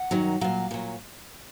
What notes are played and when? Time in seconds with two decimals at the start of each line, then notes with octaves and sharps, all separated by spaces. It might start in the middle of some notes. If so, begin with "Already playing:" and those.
Already playing: F#5
0.11 F#2 D#3 F#3
0.41 A#2 F#3 F5
0.71 A#2 F#3